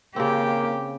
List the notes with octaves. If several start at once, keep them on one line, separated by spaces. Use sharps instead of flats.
C#3 A#3 C4 G4